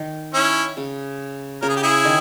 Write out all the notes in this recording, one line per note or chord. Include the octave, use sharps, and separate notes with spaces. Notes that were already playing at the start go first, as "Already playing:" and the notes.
Already playing: D#3
C#4 E4
C#3
C#3 A#4
G#4
G4
E4 G#4
D#3